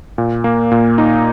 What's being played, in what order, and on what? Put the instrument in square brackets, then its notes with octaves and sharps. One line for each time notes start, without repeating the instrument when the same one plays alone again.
[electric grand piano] A#2
A#3
A#2
D#4